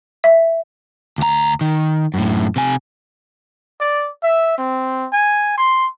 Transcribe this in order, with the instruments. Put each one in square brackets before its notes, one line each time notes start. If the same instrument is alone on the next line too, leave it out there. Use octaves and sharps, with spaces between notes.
[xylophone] E5
[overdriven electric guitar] D2 A#5
D#3
F#2 A2
C3 G#5
[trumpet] D5
E5
C4
G#5
C6